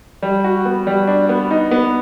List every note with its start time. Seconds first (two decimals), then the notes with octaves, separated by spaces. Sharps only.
0.22 G3
0.44 F#4
0.65 B3
0.87 G3
1.07 D4
1.29 B3
1.51 D#4
1.71 B3